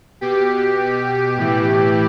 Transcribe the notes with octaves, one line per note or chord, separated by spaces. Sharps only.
B2 G4
A2 E3